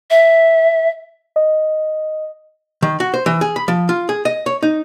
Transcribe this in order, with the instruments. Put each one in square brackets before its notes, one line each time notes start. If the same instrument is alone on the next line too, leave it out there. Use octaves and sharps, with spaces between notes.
[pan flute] E5
[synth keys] D#5
[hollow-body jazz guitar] D#3
F#4
C5
E3
G#4
B5
F3
F4
G#4
D#5
C#5
D#4